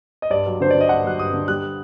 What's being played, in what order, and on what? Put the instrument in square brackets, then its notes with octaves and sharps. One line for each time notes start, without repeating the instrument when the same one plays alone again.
[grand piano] D#5
G2 D5
F#3
D3 C5
D3 D5
D#5
G2 F#5
F#3 F#6
G2 D#6
D3
G3 F#6